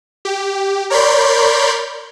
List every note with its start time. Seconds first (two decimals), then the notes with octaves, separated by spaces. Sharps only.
0.25 G4
0.90 A#4 C#5 D5 B5 C6 G6